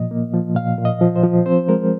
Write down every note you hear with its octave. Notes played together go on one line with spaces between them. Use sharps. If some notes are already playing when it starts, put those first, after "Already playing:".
Already playing: A#2 F3 D#5
A#3
F3
A#2 F5
A#2
D#5
F3
C5
F3
C4 C5
G#3 A#4